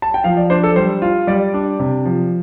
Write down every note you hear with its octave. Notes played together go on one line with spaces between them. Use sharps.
A5
G5
F3 F5
D5
D4 C5
A4
G3 C5
F4
G3 D5
D4
C3
F3